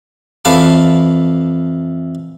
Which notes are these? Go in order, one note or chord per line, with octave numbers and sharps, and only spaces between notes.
F2 E3 B4 F5 A5 D6